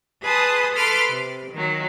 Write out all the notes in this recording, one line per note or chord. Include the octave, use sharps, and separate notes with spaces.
G#4 B4 A5 C6 D#6
A4 B4 B5 C6 D6 F6
C3
D#3 F#3